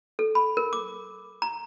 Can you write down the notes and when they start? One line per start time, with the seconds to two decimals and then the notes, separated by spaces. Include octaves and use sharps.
0.19 A4
0.35 B5
0.57 A#4
0.73 D6
1.42 A#5